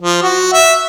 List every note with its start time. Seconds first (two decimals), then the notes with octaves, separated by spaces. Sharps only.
0.01 F3
0.23 F#4
0.53 E5